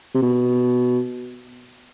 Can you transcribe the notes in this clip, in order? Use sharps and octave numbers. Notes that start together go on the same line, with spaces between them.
C3
B2